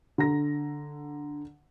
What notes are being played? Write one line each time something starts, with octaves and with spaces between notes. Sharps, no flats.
D3 A#5 A#6